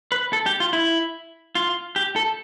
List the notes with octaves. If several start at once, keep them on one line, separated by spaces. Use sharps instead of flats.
B4
A4
G4
F4
E4
F4
G4
A4